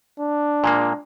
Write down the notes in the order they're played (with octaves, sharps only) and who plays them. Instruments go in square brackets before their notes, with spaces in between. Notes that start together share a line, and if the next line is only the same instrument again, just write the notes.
[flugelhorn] D4
[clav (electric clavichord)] A#2 G#3 A#3